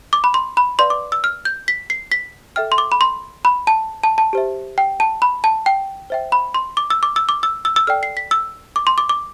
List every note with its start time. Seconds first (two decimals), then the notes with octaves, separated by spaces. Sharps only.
0.13 D6
0.24 B5
0.34 C6
0.57 B5
0.79 B4 D5 F5 C6
0.90 D6
1.12 E6
1.24 F6
1.45 G6
1.68 B6
1.90 C7
2.12 B6
2.56 A4 E5 G5 F6
2.72 C6
2.78 D6
2.92 B5
3.01 C6
3.45 B5
3.67 A5
4.04 A5
4.18 A5
4.33 G4 C5 E5
4.78 G5
5.00 A5
5.22 B5
5.44 A5
5.66 G5
6.10 C5 E5 G5
6.32 B5
6.54 C6
6.77 D6
6.90 E6
7.03 D6
7.16 E6
7.29 D6
7.43 E6
7.65 E6
7.76 E6
7.87 A4 D5 G5 F6
8.03 C7
8.17 B6
8.31 E6
8.76 D6
8.87 C6
8.98 D6
9.09 D6